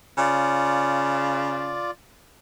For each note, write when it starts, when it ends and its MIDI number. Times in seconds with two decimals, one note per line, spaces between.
0.18 1.86 49
0.18 1.91 65
0.18 1.91 74